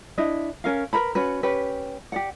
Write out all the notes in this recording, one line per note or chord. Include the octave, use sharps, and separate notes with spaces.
D4 E4 D#5
C#4 A#4 F5
A#4 B4 A#5 B5
C#4 F#4 B4
C#4 G4 B4
G4 D5 F#5